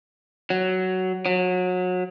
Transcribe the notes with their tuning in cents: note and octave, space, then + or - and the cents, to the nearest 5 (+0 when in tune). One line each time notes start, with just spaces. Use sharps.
F#3 +10
F#3 -25